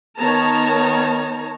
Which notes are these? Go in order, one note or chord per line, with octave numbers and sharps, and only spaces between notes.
D#3 B3 C#5 A5 A#5